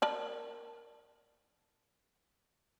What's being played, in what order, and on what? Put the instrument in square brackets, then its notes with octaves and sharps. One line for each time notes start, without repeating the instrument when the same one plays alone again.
[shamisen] A#4 D5 A5